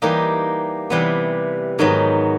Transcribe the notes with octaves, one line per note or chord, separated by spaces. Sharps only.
E3 G3 A#3 D#4 G4
C3 E3 G3 B3
G#2 D#3 F#3 B3